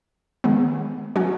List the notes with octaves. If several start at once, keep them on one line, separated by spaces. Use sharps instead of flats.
D#3 G#3 B3
F#3 C#4 F#4